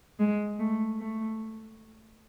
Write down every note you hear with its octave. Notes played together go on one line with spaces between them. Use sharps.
G#3
A3
A3